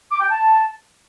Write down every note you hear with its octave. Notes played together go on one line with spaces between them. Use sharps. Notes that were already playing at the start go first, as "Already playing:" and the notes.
D6
G5
A5